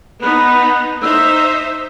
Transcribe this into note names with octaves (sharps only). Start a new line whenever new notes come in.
B3 D#4 B4
D#4 C5 E5 E6